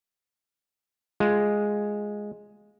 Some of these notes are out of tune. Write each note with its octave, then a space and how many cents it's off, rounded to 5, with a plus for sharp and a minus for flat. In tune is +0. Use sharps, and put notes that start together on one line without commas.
G#3 +0 F4 +0